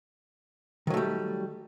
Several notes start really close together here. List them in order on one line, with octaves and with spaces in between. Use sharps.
D#3 F#3 A3 G3